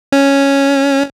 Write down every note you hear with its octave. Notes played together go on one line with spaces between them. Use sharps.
C#4